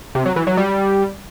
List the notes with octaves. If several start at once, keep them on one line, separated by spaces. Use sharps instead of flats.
C3
F#3
E3
F#3
G3